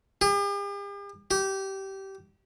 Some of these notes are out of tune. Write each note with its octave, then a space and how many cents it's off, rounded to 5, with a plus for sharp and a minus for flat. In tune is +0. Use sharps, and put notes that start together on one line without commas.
G4 +45
G4 -20